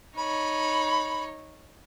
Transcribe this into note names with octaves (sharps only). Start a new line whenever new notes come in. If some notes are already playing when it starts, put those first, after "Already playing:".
D#4 C#5 B5